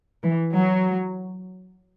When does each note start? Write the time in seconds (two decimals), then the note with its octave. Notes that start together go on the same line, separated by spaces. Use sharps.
0.24 E3
0.56 F#3